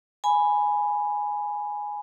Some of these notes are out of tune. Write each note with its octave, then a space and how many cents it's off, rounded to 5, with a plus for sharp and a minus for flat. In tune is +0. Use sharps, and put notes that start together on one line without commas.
G#5 +0 B5 +0